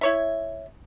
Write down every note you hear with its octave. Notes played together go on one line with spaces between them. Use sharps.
E4 C#5 E5